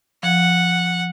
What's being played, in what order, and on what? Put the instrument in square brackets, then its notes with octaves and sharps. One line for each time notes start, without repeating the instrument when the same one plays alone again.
[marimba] F3 [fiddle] F#5